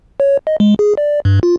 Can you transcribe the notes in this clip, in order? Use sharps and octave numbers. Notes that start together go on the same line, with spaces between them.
C#5
D#5
G#3
G#4
D5
G2
F4